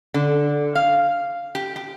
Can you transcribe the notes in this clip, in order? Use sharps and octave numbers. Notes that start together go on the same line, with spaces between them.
D3
F5
G4
G4